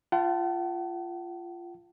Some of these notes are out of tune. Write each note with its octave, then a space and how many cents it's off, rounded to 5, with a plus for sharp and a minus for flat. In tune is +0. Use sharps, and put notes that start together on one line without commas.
F4 -15 F#5 +45 A5 +0